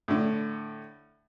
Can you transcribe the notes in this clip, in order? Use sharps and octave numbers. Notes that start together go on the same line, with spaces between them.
A2 D3